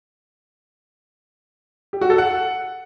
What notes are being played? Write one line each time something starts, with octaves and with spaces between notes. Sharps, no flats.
G4
F#4
A4
F#5